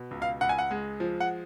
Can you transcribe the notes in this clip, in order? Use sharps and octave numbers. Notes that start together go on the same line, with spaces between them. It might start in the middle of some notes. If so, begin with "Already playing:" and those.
Already playing: B2
C#2
F5
C#2 F#5
G#5
F#5
G#3
F3
F#5